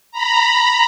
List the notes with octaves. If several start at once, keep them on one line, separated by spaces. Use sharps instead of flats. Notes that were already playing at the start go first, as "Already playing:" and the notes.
A#5 B5